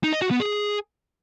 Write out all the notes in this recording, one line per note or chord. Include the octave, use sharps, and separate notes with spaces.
D#4
D#5
F#4
B3
G#4